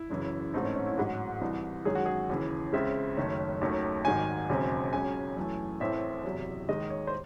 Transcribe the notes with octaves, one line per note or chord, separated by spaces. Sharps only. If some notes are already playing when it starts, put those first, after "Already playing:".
Already playing: E4
F#1 F#2 C#3 E3
A1 G#2 E3 A3 C4 D#4
C#4
C#4
E4
A1 G#2 F#3 F#4
C2 C3 E3
F#2 D#3 G#3 C#4 G#4
F#4
G#4
D#2 C#3 E3
C#2 C#3 G#3 C4 E5
F#1 F#2 D#3 A3 C#4
D#2 D#3 F#3 A3 C#4
G#1 G#2 D#3 F#3 G#5
E1 D#2 C#3 F#3 C4
C#2 C#3 F#3 C#4 G#5
F#2 E3 A3
A1 A2 E3 A3 C4 E5
F#1 E2 C3 F#3
D#2 D#3 G#3 D#5
C#5
C5